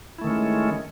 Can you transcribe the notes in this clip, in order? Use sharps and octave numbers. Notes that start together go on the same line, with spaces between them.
D#3 G#3 A3 C#4 E4